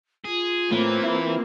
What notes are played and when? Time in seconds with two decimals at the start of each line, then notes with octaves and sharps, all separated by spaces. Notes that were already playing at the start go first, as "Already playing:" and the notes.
0.25 F4 G#4
0.71 A2 E3 A#3 C4
1.04 E4 B4